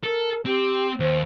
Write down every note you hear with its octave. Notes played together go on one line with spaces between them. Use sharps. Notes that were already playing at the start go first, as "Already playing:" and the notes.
A4 A#4
C4 G4
D#2 C5